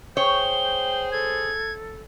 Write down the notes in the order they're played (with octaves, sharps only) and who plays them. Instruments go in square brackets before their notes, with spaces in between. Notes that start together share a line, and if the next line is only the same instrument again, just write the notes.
[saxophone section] G#4 C5 [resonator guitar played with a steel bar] C#5 [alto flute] G5 [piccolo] G7
[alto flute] A4 [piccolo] G#6